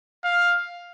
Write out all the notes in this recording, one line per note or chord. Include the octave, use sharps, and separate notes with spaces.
F5